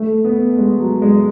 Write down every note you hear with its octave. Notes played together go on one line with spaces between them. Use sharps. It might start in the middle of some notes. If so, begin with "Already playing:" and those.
Already playing: A3
B3
G#3
F#3
G#3